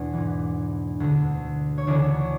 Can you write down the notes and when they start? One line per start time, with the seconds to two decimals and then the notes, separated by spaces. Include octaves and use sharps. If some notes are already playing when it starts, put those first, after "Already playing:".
Already playing: E2 B2 D4
0.13 G#2 E3
1.00 D2 D3
1.78 C#5
1.87 D2 C#3 E3 D4 D5